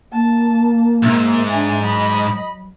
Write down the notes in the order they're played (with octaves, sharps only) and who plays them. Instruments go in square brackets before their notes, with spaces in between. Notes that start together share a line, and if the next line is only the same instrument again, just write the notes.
[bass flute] A#3 [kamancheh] A5
[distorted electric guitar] B1 G#2 [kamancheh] E5
[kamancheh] D4 G#5 [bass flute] E5
[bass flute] F#3 [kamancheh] D#5 B5